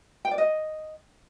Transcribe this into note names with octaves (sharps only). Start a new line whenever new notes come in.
G5
D5
D#5